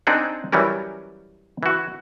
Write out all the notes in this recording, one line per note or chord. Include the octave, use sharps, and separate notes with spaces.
C4 D4 D#4 G#4 F#5
E3 F#3 G3 C#4 A#4
E3 F#4